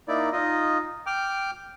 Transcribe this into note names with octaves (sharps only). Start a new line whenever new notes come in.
A#3 D#4 E4 D5
D#4 F4 D#5
G5 D6 F6